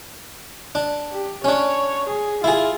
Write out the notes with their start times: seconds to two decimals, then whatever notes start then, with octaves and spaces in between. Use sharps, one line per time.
0.75 D4
1.12 G4
1.44 C#4 D4 C#5
2.09 G#4
2.44 E4 F4 G#4